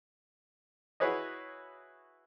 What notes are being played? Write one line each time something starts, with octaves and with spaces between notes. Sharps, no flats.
E4 F#4 G#4 B4 C#5 D#5